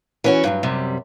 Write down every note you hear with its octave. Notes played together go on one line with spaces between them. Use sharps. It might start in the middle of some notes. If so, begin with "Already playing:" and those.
E3 C#4 F#4
G2 F3 F#3
F#2 C3 G3